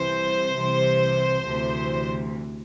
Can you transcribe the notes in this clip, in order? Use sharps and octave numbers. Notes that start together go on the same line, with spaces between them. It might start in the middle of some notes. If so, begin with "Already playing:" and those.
Already playing: C2 C3 E3 C5
C2 C3 E3
D2 C3 E3